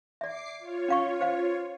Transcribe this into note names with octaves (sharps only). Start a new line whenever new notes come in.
D5 E5 D6 C7
F4 C#5
C#4 F5 C#6
C5 F5